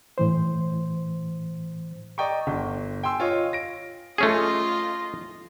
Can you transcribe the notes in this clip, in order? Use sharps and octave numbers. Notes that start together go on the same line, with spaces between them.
A2 E3 C5
D5 D#5 G5 A#5 C#6
G1
G5 G#5 C6 E6
F4 C#5 D#5
A#6 D7
A3 C#4 F4 G#4 D#5